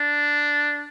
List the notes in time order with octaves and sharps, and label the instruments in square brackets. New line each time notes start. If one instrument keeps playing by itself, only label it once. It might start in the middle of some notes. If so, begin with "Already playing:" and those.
Already playing: [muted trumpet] D4